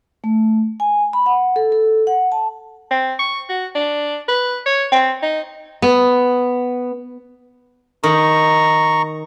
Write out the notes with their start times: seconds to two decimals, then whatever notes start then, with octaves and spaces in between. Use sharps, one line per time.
0.24 A3
0.80 G#5
1.13 B5
1.26 F#5
1.56 A4
1.72 A4
2.07 F#5
2.32 A5
2.91 C4
3.19 C#6
3.49 F#4
3.75 D4
4.28 B4
4.66 C#5
4.92 C4
5.23 D#4
5.82 B3
8.03 D#3 A#5 C#6